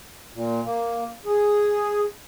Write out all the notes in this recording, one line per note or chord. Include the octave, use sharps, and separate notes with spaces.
A#2
A#3
G#4